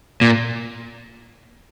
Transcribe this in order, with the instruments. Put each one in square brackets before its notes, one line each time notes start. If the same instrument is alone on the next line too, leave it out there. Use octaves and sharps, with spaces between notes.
[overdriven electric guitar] A#2